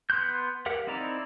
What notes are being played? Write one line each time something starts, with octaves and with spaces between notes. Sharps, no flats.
B3 C6 F#6 G6
G4 A#4 F5 F#5
C4 D#4 E4 D5 A#5